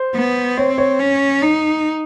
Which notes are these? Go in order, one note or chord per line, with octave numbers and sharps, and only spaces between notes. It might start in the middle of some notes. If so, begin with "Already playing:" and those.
Already playing: C5
B3
C4 C#5
C#5
C#4
D#4